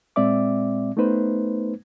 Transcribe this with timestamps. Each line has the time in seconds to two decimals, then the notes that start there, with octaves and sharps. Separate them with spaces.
0.16 A#2 G#3 C4 D5 E5 D6
0.97 A3 B3 D#4 B4 C5